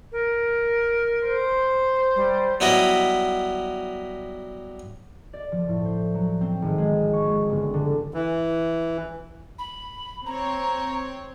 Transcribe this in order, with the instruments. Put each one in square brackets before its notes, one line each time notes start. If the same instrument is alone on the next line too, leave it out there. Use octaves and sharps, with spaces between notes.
[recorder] A#4
[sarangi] C5
[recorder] G3
[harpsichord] F#3 G3 B3 E4 D#5 B5
[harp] D5
F3
A2
C5
F#3
C4
G#1
G#3
C#6
G#3
G1
D3
[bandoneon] E3
[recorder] B5
[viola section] C4 C#5 [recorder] A#5